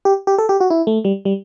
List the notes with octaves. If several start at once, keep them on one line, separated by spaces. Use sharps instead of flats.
G4
G4
A4
G4
F#4
E4
A3
G3
G3